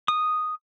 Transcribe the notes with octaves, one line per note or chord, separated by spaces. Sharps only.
D#6